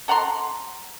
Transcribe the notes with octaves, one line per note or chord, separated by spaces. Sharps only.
A4 F#5 A#5 C6